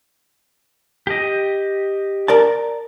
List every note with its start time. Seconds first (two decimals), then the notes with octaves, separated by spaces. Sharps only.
1.07 G4 D#5
2.28 A#4 D5 A5